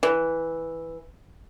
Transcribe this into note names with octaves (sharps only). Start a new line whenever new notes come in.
E3